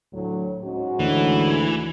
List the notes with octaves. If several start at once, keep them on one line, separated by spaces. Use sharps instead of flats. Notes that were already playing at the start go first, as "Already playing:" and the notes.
D2 A2 F#3
G#2 C#4 F#4
D2 E3